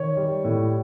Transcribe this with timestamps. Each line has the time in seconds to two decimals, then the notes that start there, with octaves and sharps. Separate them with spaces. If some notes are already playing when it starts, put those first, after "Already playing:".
Already playing: D#3 C#5
0.17 G3
0.44 A2